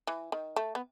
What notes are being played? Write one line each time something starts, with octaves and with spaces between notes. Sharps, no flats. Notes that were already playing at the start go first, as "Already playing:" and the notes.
E3
D#3
A3
B3